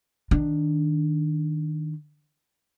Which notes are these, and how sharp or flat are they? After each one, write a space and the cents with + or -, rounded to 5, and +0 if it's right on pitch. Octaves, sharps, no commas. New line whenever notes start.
D#3 +0 D4 +0